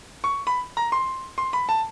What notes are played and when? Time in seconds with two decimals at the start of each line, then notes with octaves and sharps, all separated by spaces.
0.24 C#6
0.47 B5
0.77 A#5
0.92 C6
1.38 C6
1.53 B5
1.69 A5